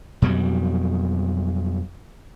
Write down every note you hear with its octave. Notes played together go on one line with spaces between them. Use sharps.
F2 B2 F#3 G3